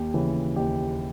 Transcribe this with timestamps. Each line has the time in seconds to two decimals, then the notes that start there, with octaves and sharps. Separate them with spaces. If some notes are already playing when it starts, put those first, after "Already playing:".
Already playing: D#2 G4
0.14 C#3 E3
0.56 D#2 G4